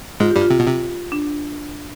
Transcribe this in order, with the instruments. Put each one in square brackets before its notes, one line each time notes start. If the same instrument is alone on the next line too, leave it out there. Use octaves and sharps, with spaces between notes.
[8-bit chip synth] G#2 G#3 [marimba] F4
[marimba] G4
[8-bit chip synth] G2 G3
[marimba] F4
[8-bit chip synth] C3
B2
C3
[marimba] D4